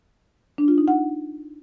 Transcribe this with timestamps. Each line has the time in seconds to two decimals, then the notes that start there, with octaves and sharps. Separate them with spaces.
0.58 D4
0.68 F4
0.78 D#4
0.88 F#5